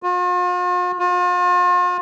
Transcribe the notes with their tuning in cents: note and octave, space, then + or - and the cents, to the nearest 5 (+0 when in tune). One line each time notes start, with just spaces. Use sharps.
F4 +45
F4 +40